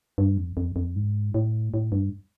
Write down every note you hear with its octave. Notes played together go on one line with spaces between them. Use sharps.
G2
F2
F2
F2
G#2
A2
A2
G2